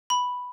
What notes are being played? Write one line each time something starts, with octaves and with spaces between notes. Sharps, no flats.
B5